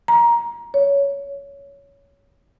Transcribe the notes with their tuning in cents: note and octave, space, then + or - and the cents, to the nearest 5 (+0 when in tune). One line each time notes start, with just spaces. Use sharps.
A#5 +15
C#5 +15